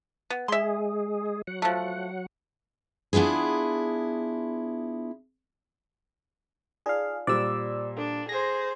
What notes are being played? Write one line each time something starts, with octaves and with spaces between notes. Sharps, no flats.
B3
G#3 G#4 E5 C6
F#3 F#5
F3 A3
B3 D4 E4 F4 G#4
D#4 F4 G#4 D5 F5
A#2 G3 C5 D5 D6 E6
D4 A4
G#4 C5 A#6